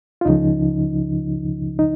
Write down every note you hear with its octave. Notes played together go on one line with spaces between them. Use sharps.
F4
C#2 C#3 F3 D#4
D#4